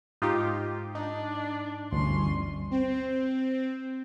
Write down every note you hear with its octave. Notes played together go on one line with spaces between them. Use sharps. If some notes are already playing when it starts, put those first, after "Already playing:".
G#2 D#4 F4 G4
D4 D#4
G1 D2 E3 C#4 C6
C4